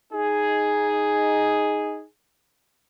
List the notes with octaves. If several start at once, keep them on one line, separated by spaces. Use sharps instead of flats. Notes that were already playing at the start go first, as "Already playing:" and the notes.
D#4 G#4